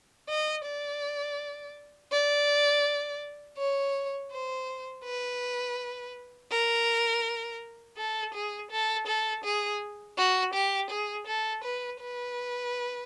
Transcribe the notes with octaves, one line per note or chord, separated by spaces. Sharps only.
D#5
D5
D5
C#5
C5
B4
A#4
A4
G#4
A4
A4
G#4
F#4
G4
G#4
A4
B4
B4